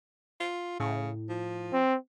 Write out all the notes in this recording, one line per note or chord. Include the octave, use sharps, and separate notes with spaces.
F4
A2 C#3
F3
C4